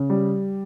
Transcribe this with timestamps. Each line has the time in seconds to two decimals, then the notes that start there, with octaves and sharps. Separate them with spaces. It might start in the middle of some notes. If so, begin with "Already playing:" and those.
Already playing: C#3
0.10 G3